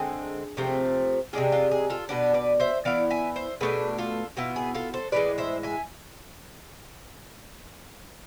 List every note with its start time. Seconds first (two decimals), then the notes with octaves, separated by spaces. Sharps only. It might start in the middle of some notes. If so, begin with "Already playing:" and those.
Already playing: D3 G#3 C4 G#4
0.57 C3 F3 A3 C4
1.33 C3 G#3 D4 F4 G#4
1.52 F4
1.71 G#4
1.90 F4 A4
2.09 B2 B3 D4
2.34 B4 D5
2.60 C5 E5
2.85 E3 B3 E4 D5 F5
3.10 E5 G#5
3.36 C5 E5
3.61 B2 A3 D4 G#4 B4
3.98 F4 A4
4.37 B2 B3 E4 F4
4.56 G#4
4.75 F4 A4
4.94 A4 C5
5.12 A2 E3 G#3 B4 D5
5.38 C5 E5
5.63 E5 G#5